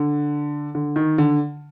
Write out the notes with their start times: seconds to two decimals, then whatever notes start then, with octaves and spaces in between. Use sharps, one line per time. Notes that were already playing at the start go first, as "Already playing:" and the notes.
Already playing: D3
0.75 D3
0.96 D#3
1.18 D3